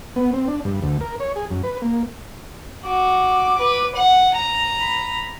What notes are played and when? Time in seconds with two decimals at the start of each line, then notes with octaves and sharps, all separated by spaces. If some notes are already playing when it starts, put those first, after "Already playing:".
0.16 B3
0.33 C4
0.48 D4
0.65 G2
0.83 D2
1.01 A#4
1.20 C#5
1.36 G#4
1.50 F#2
1.63 B4
1.82 A#3
2.84 F#4 D6
3.58 B4
3.95 F#5
4.35 A#5
4.81 B5